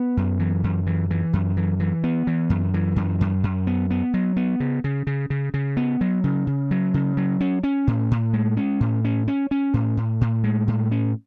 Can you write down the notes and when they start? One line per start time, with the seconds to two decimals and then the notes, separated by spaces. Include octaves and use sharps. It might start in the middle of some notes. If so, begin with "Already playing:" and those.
Already playing: B3
0.17 F#2
0.39 E3
0.64 F#2
0.87 E3
1.11 E3
1.33 F#2
1.57 E3
1.80 E3
2.04 B3
2.27 E3
2.50 F#2
2.74 E3
2.96 F#2
3.21 F#2
3.44 F#2
3.67 B3
3.91 B3
4.14 F#3
4.37 B3
4.60 C#3
4.84 C#3
5.07 C#3
5.30 C#3
5.54 C#3
5.77 B3
6.01 F#3
6.24 C#3
6.47 C#3
6.71 F#3
6.94 C#3
7.17 F#3
7.41 C#4
7.63 C#4
7.87 A2
8.11 A2
8.33 G#3
8.57 C#4
8.80 A2
9.05 C#4
9.28 C#4
9.51 C#4
9.74 A2
9.97 A2
10.21 A2
10.44 G#3
10.68 A2
10.91 C#4